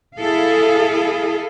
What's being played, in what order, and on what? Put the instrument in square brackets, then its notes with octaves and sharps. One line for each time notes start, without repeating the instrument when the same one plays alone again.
[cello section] E4 G#4 A4 F5